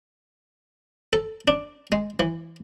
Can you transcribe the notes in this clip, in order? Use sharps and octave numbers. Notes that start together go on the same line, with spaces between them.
A4
D4
G#3
E3